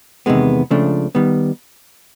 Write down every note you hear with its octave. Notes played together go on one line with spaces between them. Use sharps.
E2 C3 D#3 G#3 B3
C#2 C#3 F3 A3 D4
D#3 G3 B3